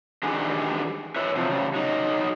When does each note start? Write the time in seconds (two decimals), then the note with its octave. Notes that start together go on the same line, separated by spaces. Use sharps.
0.23 D#3 G3 D4 F#4 G#4 B4
1.16 E4 B4 C#5 E5
1.36 C3 F3 F#3
1.50 C#3 G3
1.74 F#3 D#4